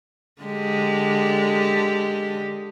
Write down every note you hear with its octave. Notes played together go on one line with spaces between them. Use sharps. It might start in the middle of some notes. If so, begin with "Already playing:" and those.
D3 G#3 G4